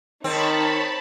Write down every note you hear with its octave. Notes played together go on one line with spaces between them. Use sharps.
D#3 C4 D#4 C#5 A5 B5 C#6